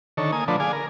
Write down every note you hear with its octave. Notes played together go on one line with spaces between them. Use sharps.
D3 D#3 A4 C#5
A#3 G#5 D#6
D3 F3 A3 D4 B4
G#4 D5 F5 G#5
A#4